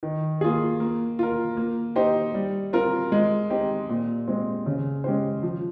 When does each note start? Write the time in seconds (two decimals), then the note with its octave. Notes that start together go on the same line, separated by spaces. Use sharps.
0.03 D#3
0.41 A#3 F4 G#4
0.80 A#3
1.19 F4 A#4
1.57 A#3
1.96 D#4 G4 C5
2.34 G3
2.73 C4 F4 A#4
3.12 G#3
3.50 C4 D#4 G4
3.89 A#2
4.28 G#3 C4
4.66 C#3
5.04 G#3 C#4 G4 C5
5.43 F3